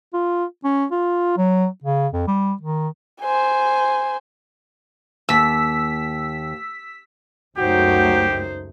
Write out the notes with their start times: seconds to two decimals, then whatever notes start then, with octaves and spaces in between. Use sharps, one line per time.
0.13 F4
0.64 C#4
0.91 F4
1.37 F#3
1.84 C#3
2.13 F2
2.28 G3
2.61 D#3
3.22 C5 G#5
5.29 D#2 E6 B6
7.58 C#2 F#2 A3 D#4 F#4 G4 C5